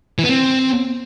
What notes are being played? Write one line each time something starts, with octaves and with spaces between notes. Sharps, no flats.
E3
B3
C4